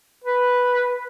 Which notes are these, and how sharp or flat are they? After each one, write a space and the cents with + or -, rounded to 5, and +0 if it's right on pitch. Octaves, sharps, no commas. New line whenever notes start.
B4 -5